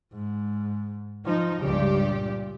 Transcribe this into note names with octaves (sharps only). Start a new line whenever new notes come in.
G#2
F3 D#4
C#2 G2 C#3 G4 D5
A#2